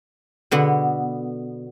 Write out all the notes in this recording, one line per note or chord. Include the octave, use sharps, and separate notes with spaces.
B2 D3 B3